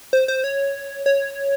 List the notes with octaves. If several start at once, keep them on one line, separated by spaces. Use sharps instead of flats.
C5
C5
C#5
C#5